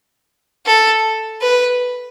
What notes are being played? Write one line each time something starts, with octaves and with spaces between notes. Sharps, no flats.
A4
B4